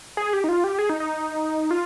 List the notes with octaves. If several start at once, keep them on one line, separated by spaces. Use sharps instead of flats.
G#4
G4
D#4
F4
G4
G#4
D#4
D#4
F4